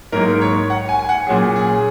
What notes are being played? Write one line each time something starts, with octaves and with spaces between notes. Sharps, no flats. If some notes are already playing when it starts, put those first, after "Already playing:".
G#2 F#3 A#3 A#4
C#5
F#5
G#5
G#5
F#5
A#2 F#3 C#4 G#4
G#4